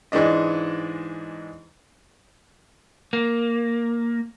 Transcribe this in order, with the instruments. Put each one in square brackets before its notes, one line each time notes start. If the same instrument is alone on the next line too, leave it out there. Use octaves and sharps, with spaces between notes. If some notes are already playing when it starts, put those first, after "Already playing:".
[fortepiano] G#2 E3 G#3 D4 D#5
[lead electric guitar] A#3